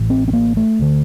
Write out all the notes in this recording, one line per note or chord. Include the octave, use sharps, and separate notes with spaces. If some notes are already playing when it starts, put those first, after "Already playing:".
Already playing: A1 A2
C4
C4
A#3
A3
D2 D3